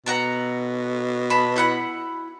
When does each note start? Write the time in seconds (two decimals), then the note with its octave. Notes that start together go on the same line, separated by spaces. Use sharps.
0.06 B2 A4 F#5 A#5
1.30 A5 B5
1.56 E4 F#5 B5